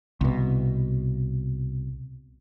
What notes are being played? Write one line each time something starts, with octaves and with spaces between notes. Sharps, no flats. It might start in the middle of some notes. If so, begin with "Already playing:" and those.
C2 B2